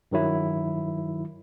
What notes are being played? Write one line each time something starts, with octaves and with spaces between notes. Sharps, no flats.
G2 D#3 F#3 E4